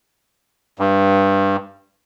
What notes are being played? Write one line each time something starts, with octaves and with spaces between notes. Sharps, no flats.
G2